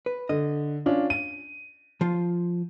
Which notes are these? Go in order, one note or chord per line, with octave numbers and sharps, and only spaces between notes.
B4
D3 D#5
C#4 D4 F4
D#7
F3 F4